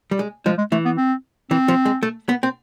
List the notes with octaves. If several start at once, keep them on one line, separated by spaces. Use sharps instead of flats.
G3
G#3
F3 G#3
G#3
E3 A3
B3
C4
E3 C4
F3
G#3
A3
B3
C4